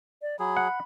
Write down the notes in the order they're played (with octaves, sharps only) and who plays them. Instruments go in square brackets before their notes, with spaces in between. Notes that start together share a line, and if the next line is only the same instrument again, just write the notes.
[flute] D5
[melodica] F#3 G#4 [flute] B5
[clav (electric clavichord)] F#5